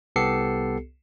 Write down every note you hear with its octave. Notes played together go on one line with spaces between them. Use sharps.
C2 B3 G4 A4 C7 C#7